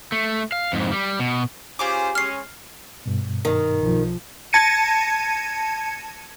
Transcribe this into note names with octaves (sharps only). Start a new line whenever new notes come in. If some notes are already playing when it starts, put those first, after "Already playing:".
A3
F5
F2 G#2
G3
B2
C#4 F4 G4 G#4 C5 D6
G#3 C#4 F6 C7
G2 B2
D#3
B1 F3
A5 G#6 A#6 C#7 D#7